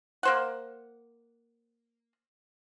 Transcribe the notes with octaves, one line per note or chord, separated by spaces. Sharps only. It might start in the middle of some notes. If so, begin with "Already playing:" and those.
A#3 C5 F#5